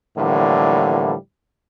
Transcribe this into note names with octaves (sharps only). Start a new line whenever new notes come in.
A2 D3 E3 F3 G3 A#3